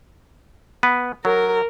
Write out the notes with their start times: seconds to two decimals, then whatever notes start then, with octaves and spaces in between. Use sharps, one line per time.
0.83 B3 B4
1.25 F#3 A#4